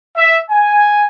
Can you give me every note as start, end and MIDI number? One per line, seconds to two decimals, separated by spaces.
0.16 0.37 76
0.50 1.04 80